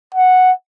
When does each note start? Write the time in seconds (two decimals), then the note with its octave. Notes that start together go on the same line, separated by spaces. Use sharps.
0.14 F#5